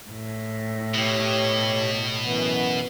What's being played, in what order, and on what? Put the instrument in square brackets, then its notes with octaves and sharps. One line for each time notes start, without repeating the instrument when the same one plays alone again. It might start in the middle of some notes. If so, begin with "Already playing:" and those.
[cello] A2
[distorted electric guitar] B2 [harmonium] G4 C#5
[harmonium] F#2 E3 B3